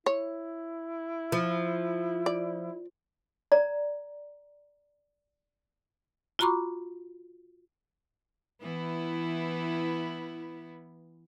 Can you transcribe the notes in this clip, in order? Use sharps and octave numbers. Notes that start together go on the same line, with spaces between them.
E4 C#5
F3
D5
D5 A#5
F4 F#4 A#5 B5 C#6 D6
E3 B3 E4